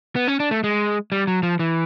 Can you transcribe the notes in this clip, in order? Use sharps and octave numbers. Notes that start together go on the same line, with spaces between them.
B3
C#4
D4
A3
G#3
G3
F#3
F3
E3